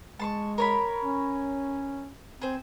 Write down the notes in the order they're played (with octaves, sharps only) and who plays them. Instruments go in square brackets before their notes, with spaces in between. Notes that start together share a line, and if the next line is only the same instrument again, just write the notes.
[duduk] G#3 [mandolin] A5 C6 C#6
[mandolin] A#4 C#5 B5
[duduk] C#4
[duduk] C4 [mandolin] G#4 C5